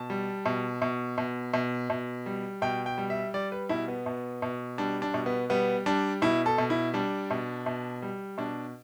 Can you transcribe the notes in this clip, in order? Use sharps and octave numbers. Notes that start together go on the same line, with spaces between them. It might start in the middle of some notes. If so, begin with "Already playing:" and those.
Already playing: B2 A5
G3
B2
B2
B2
B2
B2
G3
B2 G5
G5
G3
E5
G3 D5
B4
B2 E4
B3
B2
B2
G3 D4
D4
B2
B3
G3 B3
G3 D4
B2 E4
A4
B2
E4
G3 D4
B2
B2
G3
B2 D4